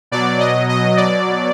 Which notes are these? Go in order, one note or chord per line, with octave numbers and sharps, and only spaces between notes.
B2 F#3 D5
D#5
D#5
D5